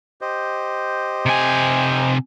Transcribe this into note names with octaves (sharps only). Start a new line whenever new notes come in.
G4 C5 D#5
C3 G#5